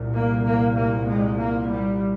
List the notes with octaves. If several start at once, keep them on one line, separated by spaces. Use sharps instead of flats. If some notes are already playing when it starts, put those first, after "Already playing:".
Already playing: C2 A#2
A#3
A#3
A#3
G#3
A#3
G3